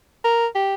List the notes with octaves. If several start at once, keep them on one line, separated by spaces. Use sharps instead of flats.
A#4
G4